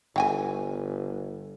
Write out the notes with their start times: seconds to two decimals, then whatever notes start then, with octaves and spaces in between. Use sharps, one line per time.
0.16 G1 E3 G5 G#5